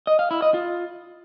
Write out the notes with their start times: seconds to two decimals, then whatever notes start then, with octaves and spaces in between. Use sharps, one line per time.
0.07 D#5
0.19 F5
0.31 E4
0.42 D#5
0.54 F4